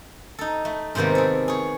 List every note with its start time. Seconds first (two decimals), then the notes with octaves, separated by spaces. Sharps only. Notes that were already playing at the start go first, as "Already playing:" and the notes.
0.39 D#4 A4
0.65 A3
0.95 G#2 C3 D#3 A#3 B3
1.15 G#4 A4
1.48 G#4 C#5